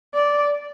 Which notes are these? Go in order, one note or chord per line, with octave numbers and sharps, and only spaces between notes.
D5